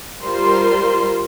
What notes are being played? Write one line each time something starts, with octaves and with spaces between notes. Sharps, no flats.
G3 F4 A#4 C5 C6